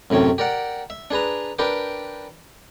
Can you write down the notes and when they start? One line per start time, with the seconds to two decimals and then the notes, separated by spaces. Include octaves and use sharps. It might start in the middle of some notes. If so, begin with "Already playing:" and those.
0.10 F#2 A2 C3 C#4
0.38 G4 A#4 D5 F#5
0.90 E5
1.11 D4 G#4 B4 A#5
1.59 D4 G4 A#4 B4 G5 D6